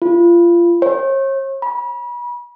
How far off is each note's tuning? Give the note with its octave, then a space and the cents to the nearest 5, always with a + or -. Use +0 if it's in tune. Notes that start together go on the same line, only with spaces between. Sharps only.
F4 -25
C#5 -40
B5 -35